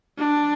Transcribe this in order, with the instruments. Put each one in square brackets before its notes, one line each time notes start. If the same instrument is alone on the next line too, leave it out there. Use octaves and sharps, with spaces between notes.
[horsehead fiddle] D4